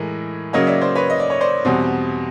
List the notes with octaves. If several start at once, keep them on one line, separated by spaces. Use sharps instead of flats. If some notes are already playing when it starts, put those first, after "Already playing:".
Already playing: A2 E3 G#3 A#4
C#3 F#3 A#3 C#5 D#5
D5 E5
C5 D5
B4 C#5
D#5
D5
C#5
C5 D5
E2 B2 G3 C4